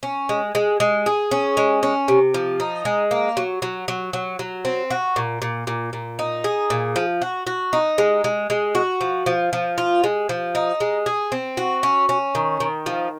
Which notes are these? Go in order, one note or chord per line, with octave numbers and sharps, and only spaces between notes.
C#4
G#3
G#3
G#3
G#4
C#4
G#3
C#4
C3
F3
D#4
G#3
A#3
F#3
F#3
F#3
F#3
F#3
C4
F#4
A#2
A#2
A#2
A#2
D#4
G#4
A#2
F3
F#4
F#4
D#4
G#3
G#3
G#3
F#4
F3
F3
F3
F4
G#3
F3
D#4
G#3
G#4
C4
F#4
C#4
C#4
D#3
D#3
F3